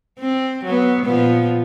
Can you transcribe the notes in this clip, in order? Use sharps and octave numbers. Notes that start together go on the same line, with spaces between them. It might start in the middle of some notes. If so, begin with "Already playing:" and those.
C4
F#3 B3
A#2 F3 B3